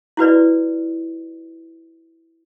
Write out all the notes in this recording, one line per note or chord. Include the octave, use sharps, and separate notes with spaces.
E4 F#4 B4 D5